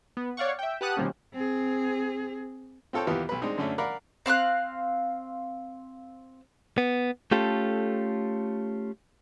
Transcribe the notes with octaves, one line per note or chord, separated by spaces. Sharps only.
B3
C#5 D5 F5 F#5 C#6
E5 G5
G4 B4 F#5 A5 D#6 F#6
B2 D#3 F3 G3 A#3 C#4
C4 G#4
C4 F4 A4 C#5 G5
D#2 E3 B3 F4 G4 D#6
B1 B4
G#3 C4 D4 D#4
F#2 D3 A3 C#4 D4
A#4 D5 F5 F#5 A#5 B5
C4 F5 D6 F#6
B3
A3 C#4 F4 G4 A4